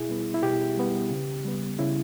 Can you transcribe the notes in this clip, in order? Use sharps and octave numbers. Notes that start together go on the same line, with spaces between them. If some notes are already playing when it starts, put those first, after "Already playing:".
Already playing: B2 E4 G#4
G3 B3
E4
B2 G4
G3 B3
C#3
G3 B3
C#3 E4